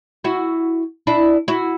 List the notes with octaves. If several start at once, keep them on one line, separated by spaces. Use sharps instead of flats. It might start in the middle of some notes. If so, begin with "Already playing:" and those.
E4 F#4
D4 E4
E4 F#4